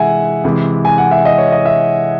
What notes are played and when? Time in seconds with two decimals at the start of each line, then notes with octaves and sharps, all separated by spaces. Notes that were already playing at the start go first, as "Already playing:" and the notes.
Already playing: C3 E3 G#3 E5 F#5 G#5
0.44 C3 E3 G#3
0.85 G#5
0.98 F#5
1.11 E5
1.25 D#5
1.38 C#5
1.52 D#5
1.65 E5